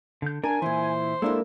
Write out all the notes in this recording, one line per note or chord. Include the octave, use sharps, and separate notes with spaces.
D3 G6
D4 A#4 G#5
A#2 E3 E4 C5
G#3 A#3 D4 E4 A4